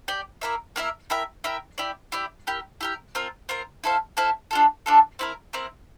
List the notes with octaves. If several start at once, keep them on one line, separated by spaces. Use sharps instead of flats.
G4 D5 G5
A#3 E4 A#4 E5
A#3 E4 A#4 E5
E4 A#4 E5 G5
E4 A#4 E5 G5
E4 G4 D5
E4 G4 D5
E4 G4 A#4
E4 G4 A#4
C4 F4 A#4
C4 F4 A#4
E4 A4 C5 F5
E4 A4 C5 F5
D4 F4 A4
D4 F4 A4
C4 E4 A#4
C4 E4 A#4